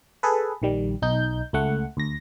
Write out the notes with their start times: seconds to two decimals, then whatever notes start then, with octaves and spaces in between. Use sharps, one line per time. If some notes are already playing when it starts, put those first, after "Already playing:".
0.23 G#4 A4 B4
0.62 A#1 D#3 G3
1.02 B1 D#4 G6
1.53 C#2 A3 F#5
1.97 D2 A#6